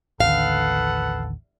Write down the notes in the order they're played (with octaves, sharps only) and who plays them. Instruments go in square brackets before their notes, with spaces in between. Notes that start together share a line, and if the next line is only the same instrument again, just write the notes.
[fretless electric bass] A1 D#2 D3 [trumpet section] A4 B4 F#5 [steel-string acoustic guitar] F5